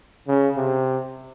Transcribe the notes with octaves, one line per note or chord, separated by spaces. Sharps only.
C#3
C3